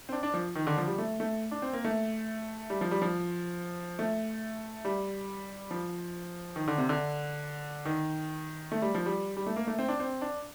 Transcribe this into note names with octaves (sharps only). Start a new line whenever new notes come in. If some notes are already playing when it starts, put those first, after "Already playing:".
C4
D4
D4
F3
D#3
D3
F3
G3
A3
A3
D4
C4
A#3
A3
G3
F3
G3
F3
A3
G3
F3
D#3
D3
C3
D3
D#3
A3
G3
F3
G3
G3
A3
A#3
A3
C4
D4
C4
D4